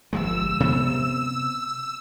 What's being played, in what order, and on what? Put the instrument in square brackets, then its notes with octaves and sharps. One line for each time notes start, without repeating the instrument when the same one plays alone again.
[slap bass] G1 F3 G#3 [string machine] E6
[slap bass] C3 B3